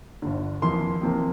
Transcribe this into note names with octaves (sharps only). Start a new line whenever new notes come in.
G1 G2 D3
F2 C3 E3 A#3 C6
F2 C3 E3 A#3